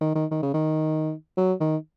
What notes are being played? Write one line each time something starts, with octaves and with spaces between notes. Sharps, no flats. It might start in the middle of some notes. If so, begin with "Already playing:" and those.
D#3
D#3
D#3
C#3
D#3
F#3
D#3